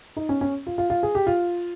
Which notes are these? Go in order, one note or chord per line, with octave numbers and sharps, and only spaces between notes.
D#4
C#4
C#4
F4
F4
F4
G#4
G4
F4